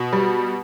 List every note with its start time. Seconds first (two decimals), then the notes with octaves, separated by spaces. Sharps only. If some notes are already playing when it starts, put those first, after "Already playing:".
Already playing: B2
0.13 G3